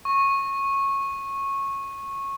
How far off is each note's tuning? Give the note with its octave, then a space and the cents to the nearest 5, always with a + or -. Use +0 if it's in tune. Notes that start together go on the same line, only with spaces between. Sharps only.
C#6 -15